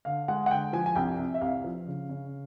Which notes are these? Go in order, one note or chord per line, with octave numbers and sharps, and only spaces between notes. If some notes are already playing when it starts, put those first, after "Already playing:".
D3 F5
G#3 F#5
F#5
D3 G5
F3 G#5
G#5
C2 G5
C3
E5
C2 F5
F3
C#3
C#3